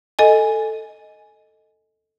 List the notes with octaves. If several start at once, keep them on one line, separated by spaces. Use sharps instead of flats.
A4 D#5 G#5